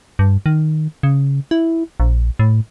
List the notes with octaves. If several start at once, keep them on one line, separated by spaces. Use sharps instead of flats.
G2
D#3
C#3
E4
A#1
A2